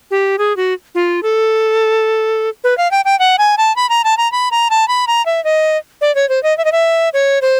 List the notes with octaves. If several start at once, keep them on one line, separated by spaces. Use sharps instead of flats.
G4
G#4
F#4
F4
A4
B4
F5
G5
G5
F#5
G#5
A5
B5
A#5
A5
A#5
B5
A#5
A5
B5
A#5
E5
D#5
D5
C#5
C5
D#5
E5
D#5
E5
C#5
C5